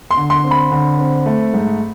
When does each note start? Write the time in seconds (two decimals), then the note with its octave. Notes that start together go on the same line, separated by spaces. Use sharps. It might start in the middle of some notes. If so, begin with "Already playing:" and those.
0.11 C6
0.17 D3
0.30 C6
0.44 C4
0.51 B5
0.72 D3
0.99 C4
1.26 A3
1.53 G#2